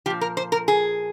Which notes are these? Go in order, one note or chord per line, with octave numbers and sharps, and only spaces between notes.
A#2 F3 G4
A#4
C5
A#4
G#4